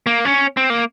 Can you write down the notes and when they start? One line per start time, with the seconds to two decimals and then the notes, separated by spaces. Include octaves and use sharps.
0.07 A#3
0.25 C#4
0.57 C4
0.70 A#3